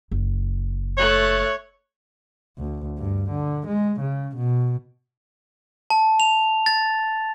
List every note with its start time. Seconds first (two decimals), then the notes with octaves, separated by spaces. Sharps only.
0.11 F#1
0.98 A3 C#5 F#6
2.58 D2
2.98 G2
3.30 D3
3.67 G#3
4.00 C#3
4.36 B2
5.90 A5
6.20 F7
6.66 A6